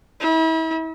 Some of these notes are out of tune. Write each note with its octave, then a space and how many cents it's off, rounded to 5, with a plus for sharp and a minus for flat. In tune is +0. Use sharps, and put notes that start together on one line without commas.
E4 -40